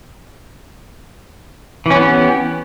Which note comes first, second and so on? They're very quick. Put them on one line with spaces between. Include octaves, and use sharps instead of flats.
E3 C#4 B3 G4